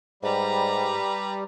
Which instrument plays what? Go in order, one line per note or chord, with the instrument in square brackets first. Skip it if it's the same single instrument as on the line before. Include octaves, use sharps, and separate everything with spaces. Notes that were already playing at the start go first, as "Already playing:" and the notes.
[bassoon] G#2 [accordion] G3 [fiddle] B4 A#5